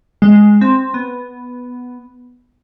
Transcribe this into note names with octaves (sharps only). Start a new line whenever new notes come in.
G#3
C4
B3